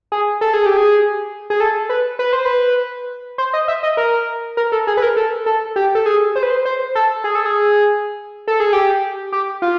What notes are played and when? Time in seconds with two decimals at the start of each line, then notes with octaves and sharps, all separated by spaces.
0.12 G#4
0.41 A4
0.54 G#4
0.66 G4
0.77 G#4
1.50 G#4
1.60 A4
1.89 B4
2.19 B4
2.33 C5
2.46 B4
3.38 C5
3.53 D#5
3.68 E5
3.83 D#5
3.97 A#4
4.57 A#4
4.72 A4
4.87 G#4
4.97 B4
5.02 A#4
5.16 A4
5.46 A4
5.76 G4
5.95 A4
6.06 G#4
6.36 C5
6.43 B4
6.50 C5
6.65 C5
6.95 A4
7.24 G#4
7.35 A4
7.46 G#4
8.48 A4
8.60 G#4
8.73 G4
9.32 G4
9.62 F4